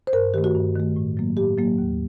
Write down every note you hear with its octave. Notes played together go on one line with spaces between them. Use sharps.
C5
G2 A#4
D#3 A3 G4
F#4
G2
D#3 A3
A2
F#3 A#3
A2 G4
F#3 A#3
D#2